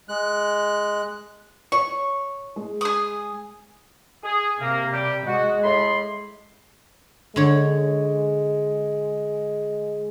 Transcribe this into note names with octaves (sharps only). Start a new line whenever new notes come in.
G#3 F#6
C#5 C#6
G#3
G#4 D#6
G#4
C3 A#3
G3 G4
G#3 F#4
A2 B5 C6
D3 G#3 C#5